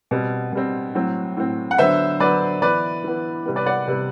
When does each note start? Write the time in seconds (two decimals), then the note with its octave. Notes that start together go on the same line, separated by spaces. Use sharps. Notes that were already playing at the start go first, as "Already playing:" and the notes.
0.11 B2 G3 C4
0.53 B2 G3 C4
0.95 A2 F#3 C4
1.37 A2 F#3 C4
1.71 F#5
1.78 D3 F#3 B3 C5 E5
2.20 D3 F#3 B3 B4 D5
2.62 E3 B3 B4 D5
3.04 E3 B3
3.46 C3 G3 B3
3.56 B4 D5
3.66 D5 F#5
3.87 C3 G3 B3